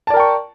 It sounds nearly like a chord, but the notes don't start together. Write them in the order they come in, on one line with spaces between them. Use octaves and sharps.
A5 D5 A#4 G5 C#6